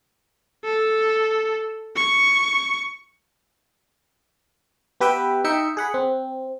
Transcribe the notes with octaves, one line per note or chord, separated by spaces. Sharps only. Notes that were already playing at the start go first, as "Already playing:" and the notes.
A4
C#6
B3 G4 B4 E5 G5
D#4 E5 G5 C#7
G#4 F#5 B5
C4